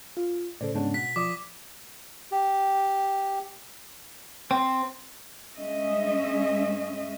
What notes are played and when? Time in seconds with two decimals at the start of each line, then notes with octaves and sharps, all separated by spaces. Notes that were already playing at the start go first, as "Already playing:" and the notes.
0.17 F4
0.61 A2 C#3 A4 C5 D5
0.74 G#2 C#3 G#3 B3 C#4 D4
0.94 B2 F#5 B6
1.16 F3 D5 D6 D#6
2.32 G4
4.51 C4
5.56 G2 G#3 C#4 D#5 E5